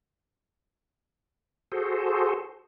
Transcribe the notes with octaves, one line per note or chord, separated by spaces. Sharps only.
F#4 G#4 A4 C5